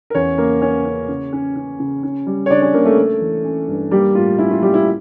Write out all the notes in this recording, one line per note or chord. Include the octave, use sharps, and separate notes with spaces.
A#4
E2 C#4 C#5
C#3 A#3 A#4
C#4 C#5
C#4
C#3
C#4
C#4
C#3
C#4
G3
C#5
C#3 D4 D5
C#4 C#5
C#3 A#3 A#4
A3 A4
A3
E3
C#4
G2
G3 A#3 G4
A2 F4
C#4 E4
F4
G3 A#3 G4
E4